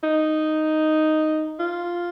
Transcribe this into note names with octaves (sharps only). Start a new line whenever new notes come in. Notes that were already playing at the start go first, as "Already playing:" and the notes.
D#4
F4